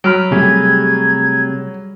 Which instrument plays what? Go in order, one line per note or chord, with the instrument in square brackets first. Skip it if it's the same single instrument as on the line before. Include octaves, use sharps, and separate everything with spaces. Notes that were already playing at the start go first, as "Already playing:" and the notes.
[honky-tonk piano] F#3 [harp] B5 F6 D7
[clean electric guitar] C3 A3 G4 [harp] G3 G#4 [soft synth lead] G#6